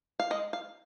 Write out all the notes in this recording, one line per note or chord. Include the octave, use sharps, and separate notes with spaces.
F5
G#3 D#5
F5